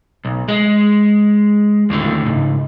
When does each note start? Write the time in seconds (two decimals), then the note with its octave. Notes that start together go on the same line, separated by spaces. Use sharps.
0.25 B1
0.48 G#3
1.90 D#2 A2 D3
2.25 C#2 G#2